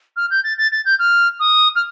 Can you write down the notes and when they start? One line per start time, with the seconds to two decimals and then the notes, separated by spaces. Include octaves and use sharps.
0.16 F6
0.30 G6
0.43 A6
0.58 A6
0.72 A6
0.85 G6
0.99 F6
1.39 D#6
1.75 F6